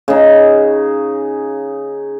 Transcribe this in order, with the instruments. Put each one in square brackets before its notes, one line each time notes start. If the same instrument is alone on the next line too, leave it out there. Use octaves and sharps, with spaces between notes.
[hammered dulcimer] C#3 D#4